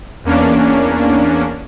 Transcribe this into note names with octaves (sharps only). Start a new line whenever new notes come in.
E2 A#3 C#4 D4